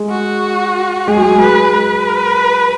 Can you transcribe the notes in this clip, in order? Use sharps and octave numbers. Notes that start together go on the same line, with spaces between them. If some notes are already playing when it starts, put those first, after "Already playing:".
Already playing: G#3
F#4
G#3 G#4
F#3
G#3
B4
B4